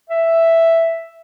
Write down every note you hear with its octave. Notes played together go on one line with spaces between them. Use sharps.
E5